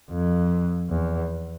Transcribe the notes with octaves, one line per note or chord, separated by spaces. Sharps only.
F2
E2